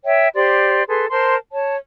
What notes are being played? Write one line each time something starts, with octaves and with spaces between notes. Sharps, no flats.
C#5 E5 G5
G4 C5 D5 C6
G#4 A4 B4 C6
A#4 C5 A5 C6
C#5 A5